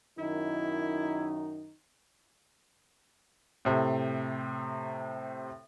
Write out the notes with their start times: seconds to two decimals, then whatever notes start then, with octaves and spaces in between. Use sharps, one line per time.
0.19 F#2 D#3 D#4 E4
3.65 A2 C3